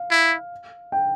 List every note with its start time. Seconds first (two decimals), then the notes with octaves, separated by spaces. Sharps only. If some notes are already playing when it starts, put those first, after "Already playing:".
Already playing: F5
0.11 E4
0.92 G5